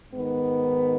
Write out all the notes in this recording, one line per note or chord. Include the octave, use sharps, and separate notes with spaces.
G#2 D#3 B3